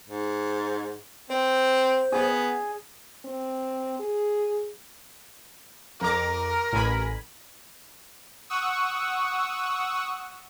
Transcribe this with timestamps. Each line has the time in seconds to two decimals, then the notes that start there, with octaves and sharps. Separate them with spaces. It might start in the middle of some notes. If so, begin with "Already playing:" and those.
0.08 G#2
1.30 C4 C5
2.12 B3 G#4
3.25 C4
4.00 G#4
6.01 F2 A#4 A#5 D6
6.73 A1 G#5 B5
8.49 F#5 C#6 D#6 E6